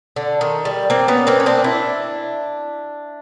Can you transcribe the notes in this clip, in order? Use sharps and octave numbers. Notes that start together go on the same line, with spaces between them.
D3
D#3
G3
A#3 C4
B3 C#4
A#3 C4
C#4
C4 D4
D4 E4